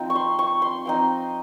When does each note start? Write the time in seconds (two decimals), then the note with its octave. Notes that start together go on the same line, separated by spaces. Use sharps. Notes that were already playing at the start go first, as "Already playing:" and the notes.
Already playing: F3 C4 D#4
0.10 C#6
0.15 C6
0.39 C#6
0.62 C6
0.85 F3 C4 D#4